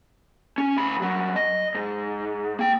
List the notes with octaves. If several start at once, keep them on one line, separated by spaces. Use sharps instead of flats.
C#4
D2 B5
G2 F#3
D#5
G#2
A#3 G5